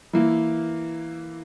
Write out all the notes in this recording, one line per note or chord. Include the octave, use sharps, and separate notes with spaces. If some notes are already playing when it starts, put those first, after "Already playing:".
E3 A#3 E4